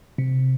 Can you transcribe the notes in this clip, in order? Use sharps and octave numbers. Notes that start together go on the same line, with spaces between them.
C3